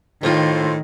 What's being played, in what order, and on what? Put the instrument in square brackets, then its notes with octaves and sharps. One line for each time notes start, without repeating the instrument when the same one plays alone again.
[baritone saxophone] A2 [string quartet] D#3 [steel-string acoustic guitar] C4 F4